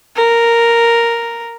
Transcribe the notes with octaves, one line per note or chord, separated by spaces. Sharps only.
A#4